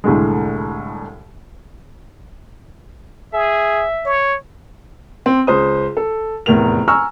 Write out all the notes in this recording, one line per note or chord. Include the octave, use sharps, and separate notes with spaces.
C2 A2 D3 G#3
G#4 E5
C#5
C4
C#2 C5 D#6
A4
F1 E2 A2 A#4 F7
G#5 A#5 C#6 E6 F6